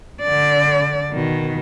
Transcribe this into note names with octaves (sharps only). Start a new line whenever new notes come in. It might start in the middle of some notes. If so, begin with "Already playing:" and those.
D3 D5
B2 D#3